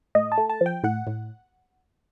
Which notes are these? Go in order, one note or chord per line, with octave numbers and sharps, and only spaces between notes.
A2 D#5
A5
A3
A5
F3
G5
A2 F#5
A2